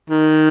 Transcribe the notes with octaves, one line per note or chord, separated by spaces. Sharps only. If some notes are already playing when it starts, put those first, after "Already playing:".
D#3